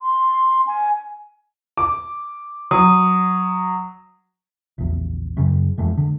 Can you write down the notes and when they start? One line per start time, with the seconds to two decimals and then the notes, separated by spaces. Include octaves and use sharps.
0.02 C6
0.67 G#5
1.77 D6
2.71 F#3 D#6
4.78 A#1 E2
5.37 F#2 C#3
5.78 F2 E3 G#3 A3
5.97 D3